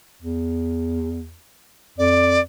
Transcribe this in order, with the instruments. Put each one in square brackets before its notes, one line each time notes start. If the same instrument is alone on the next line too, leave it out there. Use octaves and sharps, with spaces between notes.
[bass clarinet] E2
[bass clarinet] F2 [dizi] D5